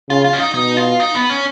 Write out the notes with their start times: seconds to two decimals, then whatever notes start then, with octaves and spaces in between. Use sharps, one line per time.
0.10 C#3 F4
0.25 F4
0.33 C#4
0.40 D#4
0.54 B2 D#4
0.77 F4
1.00 D#4
1.15 B3
1.30 C#4